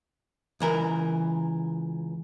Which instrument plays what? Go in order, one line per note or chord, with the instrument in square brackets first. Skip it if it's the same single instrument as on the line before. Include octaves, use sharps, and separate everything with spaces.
[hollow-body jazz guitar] C#2 E3 A#4